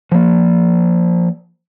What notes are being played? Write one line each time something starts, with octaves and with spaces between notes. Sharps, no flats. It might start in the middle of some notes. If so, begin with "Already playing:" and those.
F3 A#3